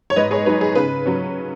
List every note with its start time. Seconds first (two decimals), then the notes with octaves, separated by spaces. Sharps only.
0.10 C#5
0.16 G#2 B4 D#5
0.31 G#4 C#5
0.46 F#3 D#4 B4
0.61 G#4
0.75 C#3 B4
1.06 F#3 C#4